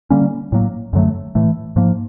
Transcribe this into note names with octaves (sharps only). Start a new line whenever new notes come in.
D3 G3 A#3 C#4
A2 F#3 A#3
F#2 D3 F#3 A3
A2 E3 A3
G#2 F3 A#3